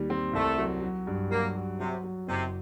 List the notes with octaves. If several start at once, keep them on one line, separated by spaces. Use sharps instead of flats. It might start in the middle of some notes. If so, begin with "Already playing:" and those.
Already playing: D#2 G3
C4
C2 A3
F#3
F#3
G2
F#3 A#3
F#3
C3 F#3
F#3
F#1 C3